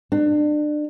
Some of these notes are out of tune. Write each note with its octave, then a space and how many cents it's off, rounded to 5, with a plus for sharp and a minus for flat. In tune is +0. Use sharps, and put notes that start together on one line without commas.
D4 +30